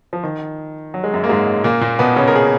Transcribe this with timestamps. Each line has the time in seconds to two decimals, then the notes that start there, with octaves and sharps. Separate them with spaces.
0.13 F3
0.23 D#3
0.94 F#3
1.04 G#3
1.14 F#2 F#3
1.24 A#3
1.29 G#2 G#3
1.64 A#2 A#3
1.81 A#2 A#3
1.99 B2 B3
2.16 C#3 C#4
2.28 A#4
2.36 G#4